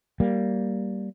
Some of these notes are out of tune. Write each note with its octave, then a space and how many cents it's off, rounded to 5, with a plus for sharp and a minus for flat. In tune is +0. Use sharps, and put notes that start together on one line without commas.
G3 -10 A#3 +0